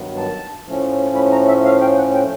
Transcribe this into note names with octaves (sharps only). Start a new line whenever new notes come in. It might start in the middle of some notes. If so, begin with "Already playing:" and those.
Already playing: G2 D#3 F#3 B3
A5
A2 F3 A3 C#4
B5
A#5
E5
F5
G5
F#5
G5